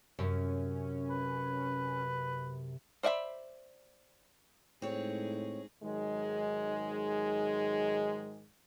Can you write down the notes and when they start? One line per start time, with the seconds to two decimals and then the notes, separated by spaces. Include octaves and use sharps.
0.19 F#2 C3 C#4
1.10 B4
3.03 C5 D5 E5 F#5 B5
4.82 A2 G#3 C4 D#4 G#4 C#5
5.83 G#2 D#3 F#3 G#3